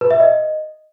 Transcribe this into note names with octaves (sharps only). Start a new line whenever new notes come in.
B4
E5
D#5